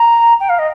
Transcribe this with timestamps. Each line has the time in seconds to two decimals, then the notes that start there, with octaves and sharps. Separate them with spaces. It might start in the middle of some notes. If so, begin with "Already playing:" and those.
Already playing: A#5
0.40 G5
0.49 F5
0.59 D#5